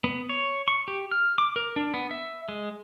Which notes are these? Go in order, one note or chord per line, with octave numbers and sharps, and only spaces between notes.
B3
C#5
C#6
G4
F6
D6
A#4
D4
B3
E5
G#3